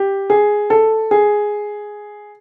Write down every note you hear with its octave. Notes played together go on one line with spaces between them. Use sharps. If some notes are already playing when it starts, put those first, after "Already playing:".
Already playing: G4
G#4
A4
G#4